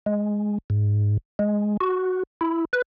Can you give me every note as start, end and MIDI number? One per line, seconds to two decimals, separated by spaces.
0.06 0.58 56
0.70 1.17 44
1.39 1.77 56
1.81 2.23 66
2.41 2.65 64
2.73 2.82 71